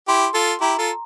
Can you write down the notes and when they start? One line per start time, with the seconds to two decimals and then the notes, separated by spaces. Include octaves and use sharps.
0.08 E4 G4 C6
0.34 F4 A4
0.61 E4 G4 A#5
0.78 F4 A4